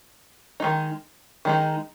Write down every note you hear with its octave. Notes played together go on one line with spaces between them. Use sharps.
D#3 G#3 D#4
D#3 G#3 D#4